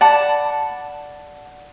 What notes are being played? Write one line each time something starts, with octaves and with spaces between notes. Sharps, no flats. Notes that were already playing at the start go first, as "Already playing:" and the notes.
D5 F#5 A5 B5